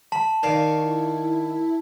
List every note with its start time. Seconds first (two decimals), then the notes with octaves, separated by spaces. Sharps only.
0.12 A5 B5
0.43 D#3 D5 F5 C#6 C7
0.78 E4